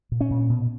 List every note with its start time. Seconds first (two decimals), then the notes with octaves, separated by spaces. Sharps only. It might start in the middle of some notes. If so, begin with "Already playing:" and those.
0.12 A#2
0.21 C#4
0.31 A#2
0.50 B2